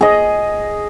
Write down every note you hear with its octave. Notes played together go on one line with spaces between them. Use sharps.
G#4 D#5